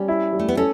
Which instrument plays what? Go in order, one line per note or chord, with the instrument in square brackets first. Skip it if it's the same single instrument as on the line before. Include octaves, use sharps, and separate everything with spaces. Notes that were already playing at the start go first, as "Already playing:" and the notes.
Already playing: [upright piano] G3 [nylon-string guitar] C#4
[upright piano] E4
G3
[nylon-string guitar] A3
B3
[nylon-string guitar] C#4 [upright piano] A4